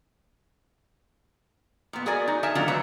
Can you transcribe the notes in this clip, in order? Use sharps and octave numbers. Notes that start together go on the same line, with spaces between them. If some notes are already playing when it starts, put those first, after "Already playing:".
A#2 B3
F#4 G#4 A#4 D5 G#5
D#4 F#4
G#4 A#4 E5 G#5 A5
D3 D#3 F#3 A3 D4 F4
D3 F#3 A3 B4 C#5 E5